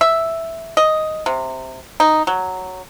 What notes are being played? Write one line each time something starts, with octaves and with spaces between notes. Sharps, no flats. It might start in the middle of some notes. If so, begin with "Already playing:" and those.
E5
D#5
C3
D#4
F#3